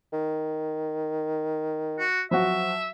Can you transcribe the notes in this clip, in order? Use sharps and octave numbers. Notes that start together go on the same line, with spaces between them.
D#3
F#4
F3 F#3 F#4 E5